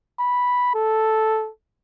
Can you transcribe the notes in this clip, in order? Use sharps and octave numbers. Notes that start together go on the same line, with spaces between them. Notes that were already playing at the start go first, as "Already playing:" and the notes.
B5
A4